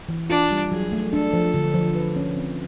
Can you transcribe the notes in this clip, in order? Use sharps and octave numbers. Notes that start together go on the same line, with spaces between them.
E3
D4 F4
G3
F#3 G#4
A3
D4 A4
F3
D3
F3
B4
C#4
C4